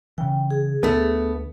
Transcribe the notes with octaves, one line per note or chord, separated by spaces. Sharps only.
C#3 E3 G5
G#4
D2 A3 B3